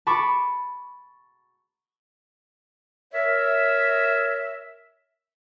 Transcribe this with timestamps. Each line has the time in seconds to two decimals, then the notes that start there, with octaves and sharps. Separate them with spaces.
0.07 A5 B5 C#6 D6
3.14 A#4 C#5 E5